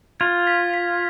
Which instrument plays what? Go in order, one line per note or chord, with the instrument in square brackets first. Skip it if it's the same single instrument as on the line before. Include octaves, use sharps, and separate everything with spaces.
[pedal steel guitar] F4 [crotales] G#6
[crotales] B6
B6